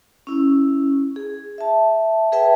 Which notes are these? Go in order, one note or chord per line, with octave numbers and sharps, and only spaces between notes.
C#4 E4
G#4
E5 A5
G#4 B4 E5 G5 A5